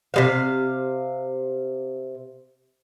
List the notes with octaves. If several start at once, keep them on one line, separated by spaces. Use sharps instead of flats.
C3 G#3 F5